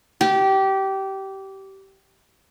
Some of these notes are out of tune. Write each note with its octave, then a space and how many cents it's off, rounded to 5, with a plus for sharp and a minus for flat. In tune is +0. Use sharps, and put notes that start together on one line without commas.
G4 -20